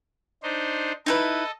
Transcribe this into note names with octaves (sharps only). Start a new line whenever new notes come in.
D4 D#4 C5
D#4 E4 A4 B4 D#5